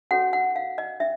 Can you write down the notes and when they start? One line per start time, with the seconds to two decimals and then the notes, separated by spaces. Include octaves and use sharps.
0.11 C#4 F#4 A4 C#5 F#5
0.33 F#5
0.56 F5
0.78 D#5
1.00 C#4 E5